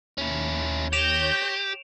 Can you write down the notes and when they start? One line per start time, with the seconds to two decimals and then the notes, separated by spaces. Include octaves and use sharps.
0.18 D#2 C#4 E4
0.93 G4 C#5 G6 A#6 D7 E7 F7